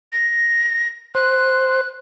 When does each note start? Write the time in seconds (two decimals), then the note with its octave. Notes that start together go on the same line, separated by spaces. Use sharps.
0.13 A#6
1.15 C5 F#6